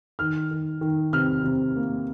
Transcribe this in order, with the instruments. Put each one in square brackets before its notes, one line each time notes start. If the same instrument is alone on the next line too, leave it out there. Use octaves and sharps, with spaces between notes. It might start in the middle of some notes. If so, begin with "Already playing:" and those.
[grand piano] D#3 F6
D#3
D#3
C3 F6
C3
A#3